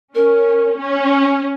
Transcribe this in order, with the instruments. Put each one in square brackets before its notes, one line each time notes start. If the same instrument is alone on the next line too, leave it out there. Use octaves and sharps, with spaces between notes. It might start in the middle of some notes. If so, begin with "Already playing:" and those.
[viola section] C#4 [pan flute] A#4
[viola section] C#4